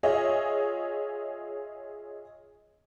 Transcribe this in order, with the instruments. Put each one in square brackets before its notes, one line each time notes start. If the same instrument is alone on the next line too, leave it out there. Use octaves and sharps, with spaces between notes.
[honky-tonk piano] F4 G#4 C#5 D#5 E5